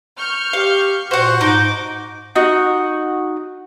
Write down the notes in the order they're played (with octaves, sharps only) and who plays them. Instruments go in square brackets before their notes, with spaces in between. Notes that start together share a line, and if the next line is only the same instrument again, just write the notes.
[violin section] C#6 F6 G6
[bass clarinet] G4 [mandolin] F5
[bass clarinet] A#2 [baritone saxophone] F#4 [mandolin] C5 F#5
[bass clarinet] G#2 [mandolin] D#4 [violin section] D6
[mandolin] D#4 F#4